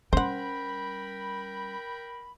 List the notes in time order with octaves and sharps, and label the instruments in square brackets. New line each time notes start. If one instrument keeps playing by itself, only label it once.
[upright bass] G3 C#4 [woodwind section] A#4 G5 B5 [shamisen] C5 F#5